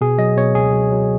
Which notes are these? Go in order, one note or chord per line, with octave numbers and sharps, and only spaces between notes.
B2 G#4
F#3 D#5
B2 C#5
C#2 G#4
F#3
F#3